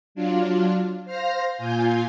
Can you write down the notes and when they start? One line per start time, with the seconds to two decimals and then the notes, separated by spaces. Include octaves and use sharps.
0.15 F#3 D4 F4
1.05 C5 F5 F6 A#6
1.57 A#2 F4 G#5 G6